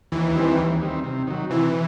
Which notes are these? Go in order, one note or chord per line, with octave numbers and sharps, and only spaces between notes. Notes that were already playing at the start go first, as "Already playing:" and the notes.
D#2 E3
D#3 G3 C4
D#2
D#3 G3 C4
C3
D#3 F#3
C3 E3